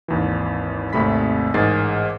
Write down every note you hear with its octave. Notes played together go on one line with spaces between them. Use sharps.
G#1 D#2 E3
G#1 D#2 C3 A3 B5 B6
A1 G#2 G#4 A#4 A6 C7